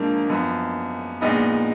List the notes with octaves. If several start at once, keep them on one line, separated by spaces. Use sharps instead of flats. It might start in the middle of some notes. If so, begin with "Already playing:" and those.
Already playing: G#2 F3 A#3 D4
F#2 F3 B3
A#1 A#2 G#3 B3 D#4